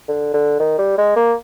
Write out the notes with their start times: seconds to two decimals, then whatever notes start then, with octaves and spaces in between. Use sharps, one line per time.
0.08 D3
0.34 D3
0.60 D#3
0.78 G3
0.98 G#3
1.16 A#3